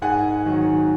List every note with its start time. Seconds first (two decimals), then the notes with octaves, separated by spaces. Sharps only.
0.02 G#2 F#5 G#5
0.46 D#3 F#3